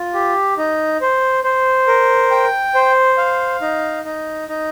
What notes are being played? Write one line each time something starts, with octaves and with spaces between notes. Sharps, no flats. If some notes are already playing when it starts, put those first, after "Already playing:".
Already playing: F4
G4
D#4
C5
C5
A#4
G5
C5
F5
D#4
D#4
D#4